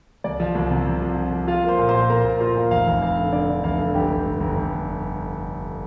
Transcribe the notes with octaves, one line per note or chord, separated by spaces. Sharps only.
C2 D5
F3
C2
C3
C3
F3
F3
F3
F4 F5
A#3
C5 C6
A#2
C5 C6
A#2
A#3 A#4 A#5
A#2
F4 C5 C6
A#2
F1 F5
F1
F2 F5
D3
D3 D5
D3
F1 F5
D3
G1 G4 G5
G1
G1
G1
G1